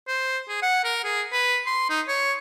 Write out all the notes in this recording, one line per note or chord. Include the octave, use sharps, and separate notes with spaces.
C5
G#4
F#5
A#4
G#4
B4
C6
D#4
C#5